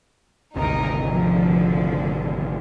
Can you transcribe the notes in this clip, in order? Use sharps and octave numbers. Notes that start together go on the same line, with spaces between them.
G#1 D2 C3 D#4 A#4
D3 F3